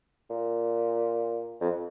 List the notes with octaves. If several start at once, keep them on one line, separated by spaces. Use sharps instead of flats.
A#2
F2